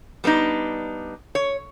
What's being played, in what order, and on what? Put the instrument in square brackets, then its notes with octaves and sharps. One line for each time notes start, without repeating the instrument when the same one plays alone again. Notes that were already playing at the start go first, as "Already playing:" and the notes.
[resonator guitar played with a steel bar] G3 B3 D4 D#4
C#5